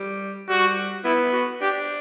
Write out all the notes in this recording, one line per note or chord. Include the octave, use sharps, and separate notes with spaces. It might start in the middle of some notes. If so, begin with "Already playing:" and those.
Already playing: G3
G3 F#4
B3 E4
F#4
D4 G4